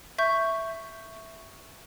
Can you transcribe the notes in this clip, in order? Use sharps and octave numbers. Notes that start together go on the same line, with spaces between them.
E5 C#6 G6